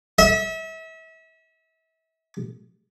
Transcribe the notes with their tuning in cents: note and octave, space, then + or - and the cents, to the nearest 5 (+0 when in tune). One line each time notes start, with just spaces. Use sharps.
E5 -35